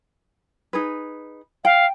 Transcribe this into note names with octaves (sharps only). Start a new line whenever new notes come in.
D#4 G#4 B4
F5 G5